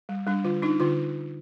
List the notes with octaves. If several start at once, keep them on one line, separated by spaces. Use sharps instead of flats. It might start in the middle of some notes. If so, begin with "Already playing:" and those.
G3
G3 D4
D3 F4
D4 D#4
D3 F4